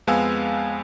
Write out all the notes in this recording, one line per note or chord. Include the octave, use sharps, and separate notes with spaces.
F2 G#3 B3 F5 G#5 E6